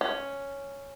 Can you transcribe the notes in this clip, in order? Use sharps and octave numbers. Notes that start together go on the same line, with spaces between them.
C#4